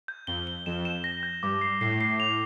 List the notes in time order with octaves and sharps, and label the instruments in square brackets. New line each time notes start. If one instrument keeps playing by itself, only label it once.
[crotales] G6
[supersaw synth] F2 [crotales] G7
[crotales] G7
[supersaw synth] F2 [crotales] E7
[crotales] E7
A#6
G6
[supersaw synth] G2 [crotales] D6
[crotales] C7
[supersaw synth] A2 [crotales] C7
[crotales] C7
F7